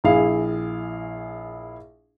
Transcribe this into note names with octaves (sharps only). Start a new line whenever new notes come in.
A#1 E4 G#4 F5